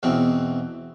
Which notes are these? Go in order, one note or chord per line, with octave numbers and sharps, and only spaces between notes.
E2 B2 C4